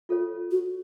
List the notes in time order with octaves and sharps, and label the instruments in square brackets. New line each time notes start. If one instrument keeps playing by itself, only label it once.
[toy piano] F4 A4 C#5
[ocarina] F#4